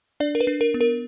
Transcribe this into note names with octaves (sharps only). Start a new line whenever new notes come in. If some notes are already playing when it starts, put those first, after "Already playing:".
D4 D5
A#4
B4
D4
A#4
B3
A#4